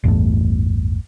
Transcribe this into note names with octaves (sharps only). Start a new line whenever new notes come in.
A1 E2 G2 A3